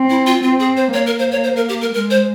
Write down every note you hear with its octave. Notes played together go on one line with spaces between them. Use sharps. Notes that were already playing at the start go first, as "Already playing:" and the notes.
Already playing: C4
E4
F4
C4 F4
G#4
C5
A#3 C#5
A#4
C5
C#5
C5
A#4
G4
A#4
G#3 A#4
C5